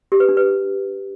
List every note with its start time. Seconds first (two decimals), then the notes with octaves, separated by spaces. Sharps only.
0.12 G4
0.20 B4
0.29 D4
0.37 B4